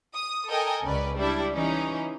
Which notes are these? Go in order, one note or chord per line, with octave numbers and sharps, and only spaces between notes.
D#6
A4 A#4 D#5 G5 G#5
C#2 C#4 B4 D5
G3 D4 E4
E3 C#4 D#4